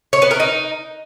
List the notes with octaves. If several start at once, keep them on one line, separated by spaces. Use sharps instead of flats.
C#5
B3
A#4
D#4